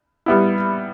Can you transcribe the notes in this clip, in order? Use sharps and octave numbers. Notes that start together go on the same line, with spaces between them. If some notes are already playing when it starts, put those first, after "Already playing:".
G3 B3 E4